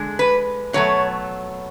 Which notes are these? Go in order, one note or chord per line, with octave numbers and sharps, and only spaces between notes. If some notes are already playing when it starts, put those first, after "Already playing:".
Already playing: D3 G#3
B4
B2 F#3 A3 C#5